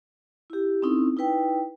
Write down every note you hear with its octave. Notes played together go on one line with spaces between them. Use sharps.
E4 G4
C4 C#4 D#4 E4 A4
D#4 E4 B4 G5